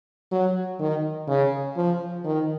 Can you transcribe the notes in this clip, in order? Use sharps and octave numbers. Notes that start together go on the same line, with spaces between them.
F#3
D#3
C#3
F3
D#3